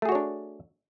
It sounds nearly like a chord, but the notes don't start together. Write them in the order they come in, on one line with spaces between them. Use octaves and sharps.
A3 G#4 F#4 C#5 D4